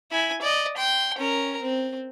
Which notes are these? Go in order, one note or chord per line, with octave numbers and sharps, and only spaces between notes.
E4 G#5
D5 D#5
G5 C6
C#4 A#4
C4